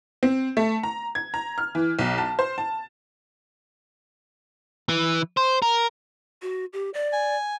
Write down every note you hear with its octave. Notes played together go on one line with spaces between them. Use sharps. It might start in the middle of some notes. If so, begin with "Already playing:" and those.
C4
A3
A#5
G#6
A#5
F6
E3
B1
A5
C5
A5
E3
C5
A#4
F#4
G4
D5
G#5